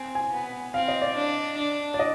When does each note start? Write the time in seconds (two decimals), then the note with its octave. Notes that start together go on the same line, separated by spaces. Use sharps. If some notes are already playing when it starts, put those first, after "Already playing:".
Already playing: C4 G#5
0.15 G#5
0.32 B3
0.74 C4 F5
0.88 D#5
1.02 D5
1.16 D4
1.57 D4
1.94 D5
1.99 D#5